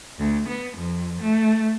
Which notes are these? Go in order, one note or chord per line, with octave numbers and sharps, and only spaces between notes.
D2
B3
F2
A3